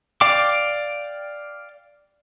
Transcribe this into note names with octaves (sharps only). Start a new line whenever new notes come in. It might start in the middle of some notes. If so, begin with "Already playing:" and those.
D5 F5 G5 D6